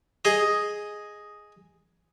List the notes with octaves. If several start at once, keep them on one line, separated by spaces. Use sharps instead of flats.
G#4 D#5